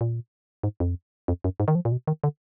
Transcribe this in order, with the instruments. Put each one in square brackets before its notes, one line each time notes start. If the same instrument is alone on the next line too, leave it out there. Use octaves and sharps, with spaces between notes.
[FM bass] A#2
G#2
F2
F2
F#2
G#2
D#3
F3
A#2
B2
D#3
D3